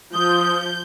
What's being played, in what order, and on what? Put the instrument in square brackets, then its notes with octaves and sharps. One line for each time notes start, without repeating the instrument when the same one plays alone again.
[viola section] F3 [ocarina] D#6 [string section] G6